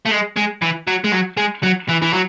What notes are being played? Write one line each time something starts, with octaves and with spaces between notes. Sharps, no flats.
A3
G#3
G#3
E3
F#3
G#3
F#3
G#3
F#3
E3
E3
F#3